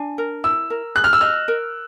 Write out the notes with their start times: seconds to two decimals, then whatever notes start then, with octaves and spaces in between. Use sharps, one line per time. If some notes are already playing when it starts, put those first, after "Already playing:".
Already playing: D4 G#5
0.18 A#4
0.44 E4 E6
0.70 A#4
0.95 G#4 F#6
1.04 F6
1.13 E6
1.21 D#5 F6
1.48 A#4